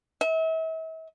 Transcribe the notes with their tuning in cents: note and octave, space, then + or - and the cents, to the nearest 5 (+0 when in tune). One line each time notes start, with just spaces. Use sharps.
E5 -40